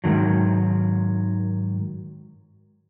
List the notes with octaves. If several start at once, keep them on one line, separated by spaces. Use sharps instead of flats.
G#2 D#3 F#3